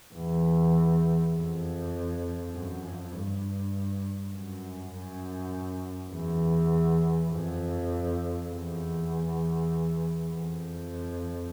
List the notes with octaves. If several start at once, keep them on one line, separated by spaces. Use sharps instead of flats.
E2
F2
F#2
F2
G2
F#2
F#2
E2
F2
E2
F2